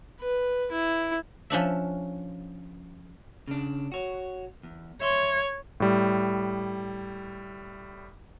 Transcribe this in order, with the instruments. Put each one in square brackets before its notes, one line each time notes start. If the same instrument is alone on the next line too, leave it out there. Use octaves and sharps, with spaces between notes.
[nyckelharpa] B4
E4
[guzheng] F3 C#4 D4 E5
[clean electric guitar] C#3 D4
F#4 C#5
E2
[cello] C#5 [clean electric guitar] E5 C6
[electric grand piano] A2 G3